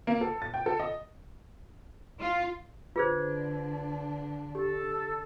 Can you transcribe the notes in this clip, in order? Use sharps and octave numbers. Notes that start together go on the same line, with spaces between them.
A#3
A4
A6
G5
A4
D#5
F4
D3 D4 F4 G#4 B4 C5 G#6
G4 A4